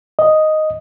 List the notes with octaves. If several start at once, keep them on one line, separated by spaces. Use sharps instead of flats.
D#5